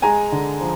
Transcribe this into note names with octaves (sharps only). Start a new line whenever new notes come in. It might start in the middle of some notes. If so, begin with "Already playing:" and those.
G#3 G#5 A#5
D3
F3